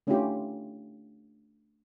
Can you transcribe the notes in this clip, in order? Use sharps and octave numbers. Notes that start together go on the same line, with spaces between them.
A3 C#4 D4 E4 F4 G4